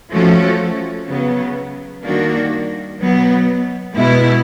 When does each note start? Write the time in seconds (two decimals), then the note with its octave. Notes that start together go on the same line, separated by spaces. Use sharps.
0.12 F3 A3 C#4 F#4 A4
1.08 C#3 F#3 B3
2.04 D#3 G3 A#3 D4 F#4
3.00 B2 F#3 B3
3.95 B2 G#3 B3 E4